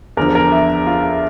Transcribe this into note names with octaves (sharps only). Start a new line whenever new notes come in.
E2 D3 F3 A#4
A#4
E5
F4